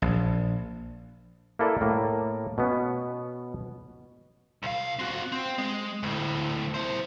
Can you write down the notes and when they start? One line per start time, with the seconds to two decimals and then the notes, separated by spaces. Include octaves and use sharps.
0.02 A#1
1.59 A#3 E4 A4 B4 D5
1.81 A2 A#3
2.58 B2 B3 C#4
4.63 C2 F5
4.99 C4 F#4
5.32 C4
5.58 G#3
6.03 D2 A2
6.74 E4 C5